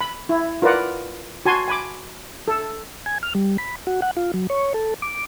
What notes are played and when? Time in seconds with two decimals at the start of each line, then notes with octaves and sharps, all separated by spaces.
0.01 B5
0.29 E4
0.62 F4 A#4 B4 D5 F#5
1.45 F#4 G#5 A5 C6
1.68 G#5 B5 D6
2.48 A4
3.06 G#5
3.23 F6
3.35 G3
3.58 B5
3.87 F#4
4.02 F#5
4.17 F4
4.34 F#3
4.50 C#5
4.74 A4
5.02 D6